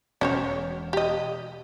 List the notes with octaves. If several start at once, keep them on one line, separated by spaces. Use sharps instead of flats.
E1 C#4 C5 C#5
G4 D#5